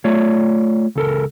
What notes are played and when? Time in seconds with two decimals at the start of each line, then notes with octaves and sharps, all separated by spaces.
0.04 A3 F4 C#5 D5
0.96 C#2 A4 A#4